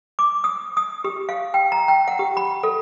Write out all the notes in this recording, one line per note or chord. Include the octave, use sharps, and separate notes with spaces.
D6
D#6
D#6
G4
F5
G5
A#5
G5
F#5
G4
B5
A4